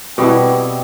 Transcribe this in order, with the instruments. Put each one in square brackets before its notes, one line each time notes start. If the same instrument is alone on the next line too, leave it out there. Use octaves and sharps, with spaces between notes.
[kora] B2 G3 B3 E4 [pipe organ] C4